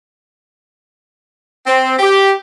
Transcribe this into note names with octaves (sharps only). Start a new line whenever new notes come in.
C4
G4